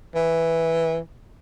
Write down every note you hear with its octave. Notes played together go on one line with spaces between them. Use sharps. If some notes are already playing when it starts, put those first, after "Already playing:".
E3